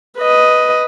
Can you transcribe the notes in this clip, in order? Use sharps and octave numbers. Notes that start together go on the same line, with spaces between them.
B4 D#5